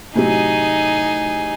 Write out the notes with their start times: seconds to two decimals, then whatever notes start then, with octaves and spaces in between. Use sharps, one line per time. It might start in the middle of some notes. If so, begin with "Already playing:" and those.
0.15 A2 C3 F#3 D#4 G#4